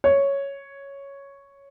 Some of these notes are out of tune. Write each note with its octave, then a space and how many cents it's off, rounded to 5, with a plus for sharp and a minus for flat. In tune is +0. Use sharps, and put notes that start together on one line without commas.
C#5 +0